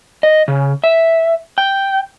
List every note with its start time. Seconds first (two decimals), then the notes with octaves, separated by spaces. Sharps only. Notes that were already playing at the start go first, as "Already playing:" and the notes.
0.23 D#5
0.48 C#3
0.84 E5
1.58 G5